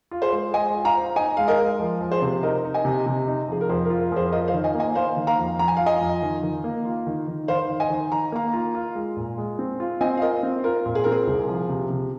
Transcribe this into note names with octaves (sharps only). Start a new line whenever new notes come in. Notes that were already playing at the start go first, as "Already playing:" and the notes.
F4
G#4 C5
G#3
G#3 D#5 G#5
F4
F5 A#5
C5
D#4 D#5 G#5
G#3 F5
A#4 D#5
G#3
F3
F3
G#4 C5
C3
D#4 A#4 D#5
D#4
D#5 G#5
C3
C3
D#4
F3 G#4
A#4
F2 G#4 C5
A#4
F4
A#4
F2 G#4 C5
F4 A#4 D#5
C5 F5
D#3
D#5 G#5
A#3
D#5 G#5
A#3 C5 F5
D#3
F5 A#5
F2
F2 A#5
G#5
F4 F5
D#5 G#5
F2
D#3
D#3
A#3
F4
D#3
D#3
D#3 C5 F5
D#3
D#5 G#5
D#3
D#3 A#5
A#3 F5 A#5
F4
F4
G#3
A#2
G#3
C4
F4
C4 D#5 G#5
F5
F4 A#4 D#5
C4
F4 A#4
A#2
G#4
C4 A#4
G#4
C2
F3
C3
C3